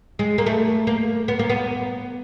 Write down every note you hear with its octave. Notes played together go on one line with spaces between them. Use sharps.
G#3
A#3
A3
A#3
B3
A#3
B3